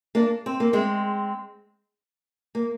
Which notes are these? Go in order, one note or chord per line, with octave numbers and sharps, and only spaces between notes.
A#3 D4
C4
A#3
G#3 C4
A#3